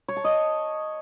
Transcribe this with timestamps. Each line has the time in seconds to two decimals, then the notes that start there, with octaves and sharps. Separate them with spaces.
0.08 C#5
0.16 A5
0.24 D#5